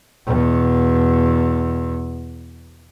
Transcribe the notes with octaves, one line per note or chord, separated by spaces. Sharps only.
E2 B2